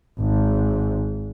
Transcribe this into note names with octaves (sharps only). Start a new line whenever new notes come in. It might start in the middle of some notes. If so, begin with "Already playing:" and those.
G#1 G#2